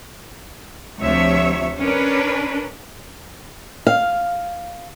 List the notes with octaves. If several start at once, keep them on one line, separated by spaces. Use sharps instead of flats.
D2 C3 F3 C#5 E5
C#4 D4 A#4 B4
F5